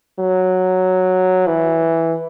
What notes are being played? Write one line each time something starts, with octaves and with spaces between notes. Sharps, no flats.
F#3
E3